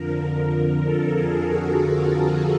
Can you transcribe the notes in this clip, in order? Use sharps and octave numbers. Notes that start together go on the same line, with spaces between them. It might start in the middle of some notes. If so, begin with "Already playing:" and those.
Already playing: F2 D3 F3 A#4
A4
G#4
F#4
F4
F4